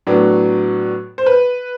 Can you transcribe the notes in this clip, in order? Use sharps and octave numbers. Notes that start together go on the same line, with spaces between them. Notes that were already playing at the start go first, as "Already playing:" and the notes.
A2 F#3 B3 D4
C5
B4